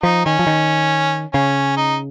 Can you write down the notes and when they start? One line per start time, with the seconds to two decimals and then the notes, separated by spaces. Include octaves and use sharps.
0.03 F3 D#4
0.26 D#3 C#4
0.39 F3
0.47 D#3
1.34 C#3 C#4
1.76 D#4